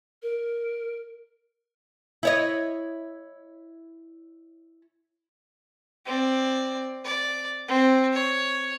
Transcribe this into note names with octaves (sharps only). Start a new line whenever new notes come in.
A#4
E4 C#5 D#5
C4 D5
D5
C4
C#5